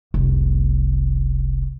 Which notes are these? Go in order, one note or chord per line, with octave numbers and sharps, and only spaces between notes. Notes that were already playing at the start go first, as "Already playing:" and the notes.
F1 C2